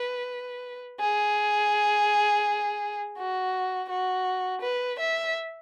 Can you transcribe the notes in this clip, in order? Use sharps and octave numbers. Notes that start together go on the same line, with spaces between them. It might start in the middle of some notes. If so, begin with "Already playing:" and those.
Already playing: B4
G#4
F#4
F#4
B4
E5